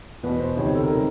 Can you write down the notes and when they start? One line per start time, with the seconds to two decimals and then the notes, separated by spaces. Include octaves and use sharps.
0.23 E2 B2 B4
0.40 C5
0.57 C#2 C3 D#3 C#5
0.65 C5
0.75 A4
0.83 A#4
0.93 C3 D#3